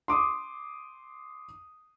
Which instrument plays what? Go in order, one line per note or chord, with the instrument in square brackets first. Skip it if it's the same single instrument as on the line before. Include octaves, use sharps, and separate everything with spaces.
[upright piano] C6 D6 D#6